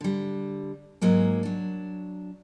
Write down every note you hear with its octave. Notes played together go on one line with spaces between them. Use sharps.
D3 G3
G#2 F#3 G#3 A#3
F#3 D4